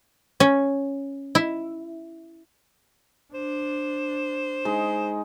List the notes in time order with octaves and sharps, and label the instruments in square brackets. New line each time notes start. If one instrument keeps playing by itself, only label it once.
[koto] C#4
E4
[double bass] D4 [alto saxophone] C5
[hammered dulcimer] G#3 D#4